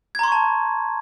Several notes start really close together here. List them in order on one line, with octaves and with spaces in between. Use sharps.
G#6 A#5 C6 C#6 A5